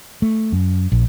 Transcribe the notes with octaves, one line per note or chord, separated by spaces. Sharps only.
A3
F#2
A#1